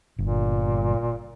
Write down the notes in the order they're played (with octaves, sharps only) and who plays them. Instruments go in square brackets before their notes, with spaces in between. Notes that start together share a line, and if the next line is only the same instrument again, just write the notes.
[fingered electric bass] G1 [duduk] A#2